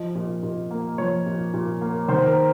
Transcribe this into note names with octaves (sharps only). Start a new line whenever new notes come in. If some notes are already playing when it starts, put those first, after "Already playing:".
Already playing: F3 D#5
A#2
A#2
A#3
F3 C#5
A#2
A#2
A#3
D#3 C5
A#4